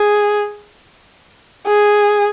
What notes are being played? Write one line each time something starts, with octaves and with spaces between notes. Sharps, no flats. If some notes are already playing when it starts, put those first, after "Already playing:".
Already playing: G#4
G#4